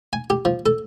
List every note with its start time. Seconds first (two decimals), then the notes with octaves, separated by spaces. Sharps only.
0.13 G#5
0.30 G4
0.45 F3
0.66 A4